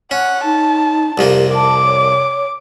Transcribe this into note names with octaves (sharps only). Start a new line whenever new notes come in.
C#4 F#5
D#4 A5
C2 F2 A#3 G4
A5 D6
C#5